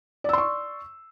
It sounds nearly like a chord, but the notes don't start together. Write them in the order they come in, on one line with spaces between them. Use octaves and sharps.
D5 E6 C6 C#6